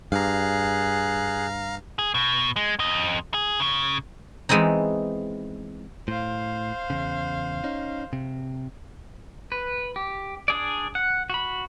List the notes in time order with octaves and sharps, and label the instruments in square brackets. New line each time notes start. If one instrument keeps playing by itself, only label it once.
[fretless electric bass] G2 [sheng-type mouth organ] G#4 F#6 [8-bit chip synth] F5 A#5
[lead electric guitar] G#4
B2
G#3
F2 D#5
G#4
C#3
[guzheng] E3 G#3 B3 C4 D#4
[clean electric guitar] A2 [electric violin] C5 F5
[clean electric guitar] E2 C#3
C#4 D#4
C3
[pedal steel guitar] B4
G4
D4 G#4 D5
F#5
F#4 B5